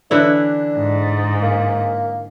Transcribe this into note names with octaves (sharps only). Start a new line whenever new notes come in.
D3 E3 D4 E4
G#2
A#3